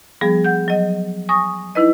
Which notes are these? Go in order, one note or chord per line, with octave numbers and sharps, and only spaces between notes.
F3 G3 B3 G#4
F#5 G6
F#3 D#5
G#5 C#6 D#6 A#6
D#4 E4 B4 D#5